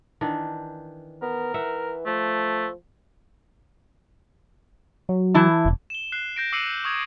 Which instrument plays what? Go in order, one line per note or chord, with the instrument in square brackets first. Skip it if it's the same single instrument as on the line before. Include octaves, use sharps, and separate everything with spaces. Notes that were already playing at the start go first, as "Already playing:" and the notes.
[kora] D#3 E3 D4
[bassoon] B3 [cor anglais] A#4
[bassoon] E3 [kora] E5 F#5
[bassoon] F3 [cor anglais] A3
[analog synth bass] F#3
[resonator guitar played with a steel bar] E3 E4 A5
[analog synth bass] F1
[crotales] E7 G7
F#6 C7
G6 A#6 D7
D6 E6 C7 C#7 D#7 F#7
C#6 D#6 G#6